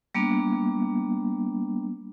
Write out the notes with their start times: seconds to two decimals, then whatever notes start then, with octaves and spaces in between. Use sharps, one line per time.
0.15 G3 A#3 B3 D4